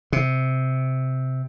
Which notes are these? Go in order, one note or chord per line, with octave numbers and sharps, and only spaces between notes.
C3